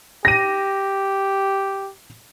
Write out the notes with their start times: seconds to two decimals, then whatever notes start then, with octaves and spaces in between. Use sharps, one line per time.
0.25 G4 A#6 D#7